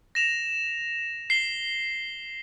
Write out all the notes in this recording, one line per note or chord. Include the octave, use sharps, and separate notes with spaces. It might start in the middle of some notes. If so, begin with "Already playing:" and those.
A#6 E7 F7
C7 G7